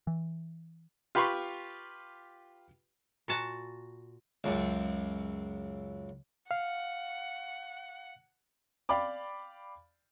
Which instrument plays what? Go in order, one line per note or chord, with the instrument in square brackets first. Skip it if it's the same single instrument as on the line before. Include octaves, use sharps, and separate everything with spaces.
[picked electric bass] E3
[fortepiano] F4 G4 B4 C6 C#6
[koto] A#2 F#4 A5
[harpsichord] C#2 F#2
[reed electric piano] F5 [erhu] F#5
[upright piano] D5 F5 G5 B5 D6